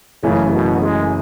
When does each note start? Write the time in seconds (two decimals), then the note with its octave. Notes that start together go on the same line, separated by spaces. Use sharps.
0.23 F#1 F#2 C#3 E3 A3 C#4
0.52 B2
0.81 G#3